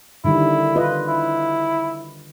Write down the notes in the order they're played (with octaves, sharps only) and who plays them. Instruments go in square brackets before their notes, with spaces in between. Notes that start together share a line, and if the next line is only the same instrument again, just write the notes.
[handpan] D3 D#3 G3 [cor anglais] E4
[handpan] F4 B4 D#5
[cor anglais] E4